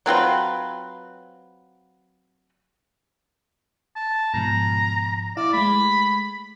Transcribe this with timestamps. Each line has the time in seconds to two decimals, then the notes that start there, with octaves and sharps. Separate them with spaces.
0.06 F#3 C4 F4 B4
3.96 A5
4.34 G#2 B2 F3 A#5
5.37 E4 D5 F5
5.54 G#3 A3 B5